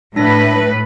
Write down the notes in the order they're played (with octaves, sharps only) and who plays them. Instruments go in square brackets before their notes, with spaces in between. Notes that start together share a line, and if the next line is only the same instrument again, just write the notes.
[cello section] A2 B4 [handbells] D4 A#6